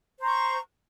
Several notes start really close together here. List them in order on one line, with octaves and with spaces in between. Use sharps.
C5 A#5 C#6